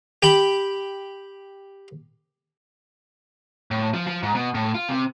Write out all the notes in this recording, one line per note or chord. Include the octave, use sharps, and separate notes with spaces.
G4 G5 B5
A2
F3
F3
G#2
B2
A2
F4
C3